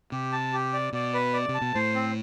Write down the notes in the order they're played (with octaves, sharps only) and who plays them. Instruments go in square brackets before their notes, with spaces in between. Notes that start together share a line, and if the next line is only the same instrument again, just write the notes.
[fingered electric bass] C3 [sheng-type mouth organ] G4
[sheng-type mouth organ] A5
G4
D5
[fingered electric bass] B2 [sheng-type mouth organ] D5
[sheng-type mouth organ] B4
D5
[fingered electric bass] C3
[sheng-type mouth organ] A5
[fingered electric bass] B2
[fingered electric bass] A2 [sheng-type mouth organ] C5
[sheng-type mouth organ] C4